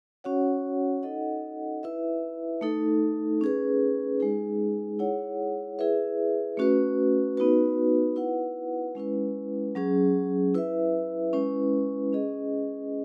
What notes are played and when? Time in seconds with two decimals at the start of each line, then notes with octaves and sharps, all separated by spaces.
0.24 C#4 F#4 C#5 F#5
1.03 D#4 A4 D#5 F#5
1.83 E4 B4 E5
2.61 A3 D#4 A4
3.41 C#4 G#4 B4
4.20 G#3 D#4 G#4
4.99 E4 G#4 C#5 F#5
5.79 E4 G#4 B4 E5
6.57 A3 C#4 F#4 B4
7.37 B3 D#4 F#4 B4
8.16 E4 B4 F#5
8.95 G#3 C#4 E4 B4
9.75 F#3 C#4 G#4
10.54 E4 B4 E5
11.33 G#3 C#4 E4 B4
12.13 C#4 G#4 D#5